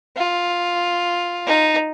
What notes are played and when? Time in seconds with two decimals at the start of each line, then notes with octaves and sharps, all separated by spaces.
0.17 F4
1.47 D#4